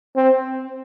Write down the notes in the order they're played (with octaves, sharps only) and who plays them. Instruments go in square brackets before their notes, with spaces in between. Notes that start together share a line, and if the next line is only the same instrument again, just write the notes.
[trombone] C4